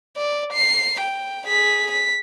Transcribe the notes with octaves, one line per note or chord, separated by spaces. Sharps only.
D5
C7
G5
G#4 B6
B6